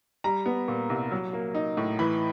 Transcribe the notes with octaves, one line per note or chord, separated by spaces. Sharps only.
G3 A#5
B3
A#2
C2
F#3
A#3
D#4
A2
E3 B5